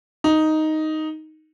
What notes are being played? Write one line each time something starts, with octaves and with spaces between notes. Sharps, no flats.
D#4